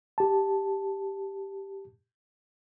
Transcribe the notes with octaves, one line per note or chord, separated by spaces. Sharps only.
G4 A5